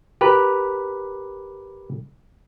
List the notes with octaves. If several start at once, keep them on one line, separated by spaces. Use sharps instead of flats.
G4 A#4 B4